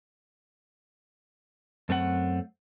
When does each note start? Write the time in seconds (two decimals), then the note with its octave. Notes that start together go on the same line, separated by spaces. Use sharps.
1.89 F#2 A3 C4 D4 F#5